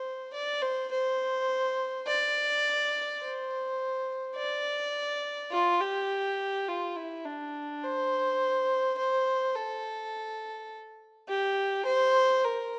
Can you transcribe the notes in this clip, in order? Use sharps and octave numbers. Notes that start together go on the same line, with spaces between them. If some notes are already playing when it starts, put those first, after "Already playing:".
Already playing: C5
D5
C5
C5
D5
C5
D5
F4
G4
F4
E4
D4
C5
C5
A4
G4
C5
A#4